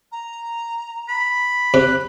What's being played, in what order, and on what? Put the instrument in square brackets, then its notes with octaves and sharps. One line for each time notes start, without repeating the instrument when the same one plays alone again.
[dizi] A#5
[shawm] B5
[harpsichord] C3 [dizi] F#6